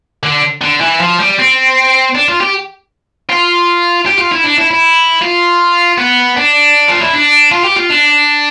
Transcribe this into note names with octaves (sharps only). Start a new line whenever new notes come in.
D3
D3
E3
F3
G3
C4
D4
F4
G4
F4
G4
F4
E4
D4
E4
E4
F4
B3
D4
F4
E4
D4
F4
G4
F4
D4